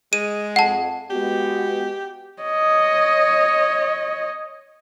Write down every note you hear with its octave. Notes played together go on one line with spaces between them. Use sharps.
G#3 D#7
F2 F#5 A5
G#3 B3 F#4 G4
C#5 D#5